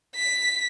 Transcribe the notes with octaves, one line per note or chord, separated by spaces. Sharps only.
B6